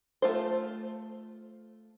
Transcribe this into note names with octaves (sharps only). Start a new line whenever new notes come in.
A3 F4 C5